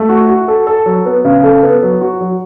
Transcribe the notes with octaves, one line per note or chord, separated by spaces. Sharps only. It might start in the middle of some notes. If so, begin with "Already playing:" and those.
Already playing: A3
F#4
F#4
A4
A4
F#3
B3
C#3
A4
B3
F#3
F#4
F#3